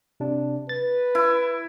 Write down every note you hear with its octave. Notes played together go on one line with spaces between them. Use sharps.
C3 D4
B4 A6
E4